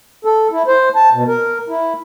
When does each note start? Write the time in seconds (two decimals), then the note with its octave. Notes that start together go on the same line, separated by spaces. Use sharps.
0.25 A4
0.52 E4
0.67 C5
0.95 A5
1.13 B2
1.28 A#4
1.69 E4